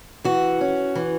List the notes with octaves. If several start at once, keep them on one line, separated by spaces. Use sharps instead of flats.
E3 F#4
C#4
E3